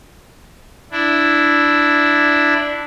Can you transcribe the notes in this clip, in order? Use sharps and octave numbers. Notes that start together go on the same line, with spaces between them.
D4 E4